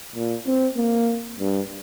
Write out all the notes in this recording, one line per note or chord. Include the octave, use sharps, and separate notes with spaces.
A#2
C4
A#3
G2